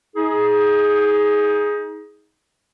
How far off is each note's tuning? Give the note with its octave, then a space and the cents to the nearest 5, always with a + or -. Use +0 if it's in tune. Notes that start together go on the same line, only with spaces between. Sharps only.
D#4 +25 G#4 +0